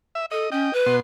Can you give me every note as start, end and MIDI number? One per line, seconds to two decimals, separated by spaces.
0.15 0.26 76
0.31 0.50 69
0.31 0.50 75
0.52 0.71 61
0.52 0.74 75
0.52 0.74 79
0.73 0.95 71
0.86 1.00 47
0.86 1.00 84